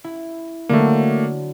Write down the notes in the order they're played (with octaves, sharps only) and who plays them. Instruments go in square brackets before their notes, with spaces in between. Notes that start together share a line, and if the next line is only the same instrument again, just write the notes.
[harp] E4
[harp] D3 F#3 [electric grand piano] A3 A#3